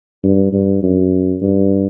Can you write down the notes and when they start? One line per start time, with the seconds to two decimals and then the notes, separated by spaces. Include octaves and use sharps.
0.23 G2
0.52 G2
0.83 F#2
1.41 G2